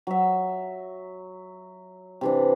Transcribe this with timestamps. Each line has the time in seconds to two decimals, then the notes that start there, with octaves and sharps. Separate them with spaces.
0.07 F#3 E5
2.21 C3 E3 D4